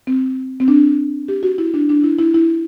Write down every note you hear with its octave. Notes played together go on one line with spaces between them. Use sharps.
C4
C4
D4
G4
F#4
E4
D4
D4
E4
E4
E4